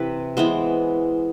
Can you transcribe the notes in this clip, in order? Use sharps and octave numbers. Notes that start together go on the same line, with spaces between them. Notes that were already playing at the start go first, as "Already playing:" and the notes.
Already playing: C3 E3 B4
E3 G#3 B3 C5